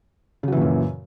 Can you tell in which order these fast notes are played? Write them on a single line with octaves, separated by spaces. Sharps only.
C#3 F#3 E3 A#2 F#2